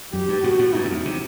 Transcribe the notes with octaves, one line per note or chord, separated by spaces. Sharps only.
F#2 G4
G2
A2 F#4
A2
G2 D#4
F#2
E2
C3